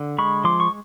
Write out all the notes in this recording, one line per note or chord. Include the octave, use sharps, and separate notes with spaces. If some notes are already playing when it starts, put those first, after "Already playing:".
Already playing: D3
G#3 B5 C#6
F3 C6 D6
C#6